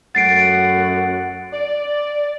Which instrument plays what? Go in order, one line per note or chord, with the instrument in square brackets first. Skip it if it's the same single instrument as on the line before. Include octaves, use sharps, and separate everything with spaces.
[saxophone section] F#2 A3 F#5 [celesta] A6 C7 D7
[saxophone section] D5